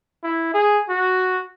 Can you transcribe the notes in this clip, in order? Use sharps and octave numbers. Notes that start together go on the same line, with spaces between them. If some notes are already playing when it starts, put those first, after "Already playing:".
E4
G#4
F#4